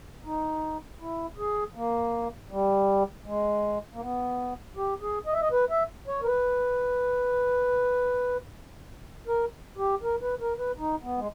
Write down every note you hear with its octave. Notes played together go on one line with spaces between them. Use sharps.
D#4
E4
G#4
A#3
G3
G#3
A#3
B3
G4
G#4
D#5
E5
D#5
B4
E5
C#5
A#4
B4
A#4
G4
A#4
B4
A#4
B4
D#4
B3
G#3